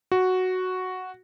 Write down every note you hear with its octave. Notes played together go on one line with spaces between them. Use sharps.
F#4